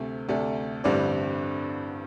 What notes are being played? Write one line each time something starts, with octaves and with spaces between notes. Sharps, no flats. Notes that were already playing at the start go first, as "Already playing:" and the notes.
Already playing: D2 C3 A3
D2 C3 A3 D4 A4
A1 G2 D3 G3 C4 D5